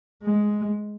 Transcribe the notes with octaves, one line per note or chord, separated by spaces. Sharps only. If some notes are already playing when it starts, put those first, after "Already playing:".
G#3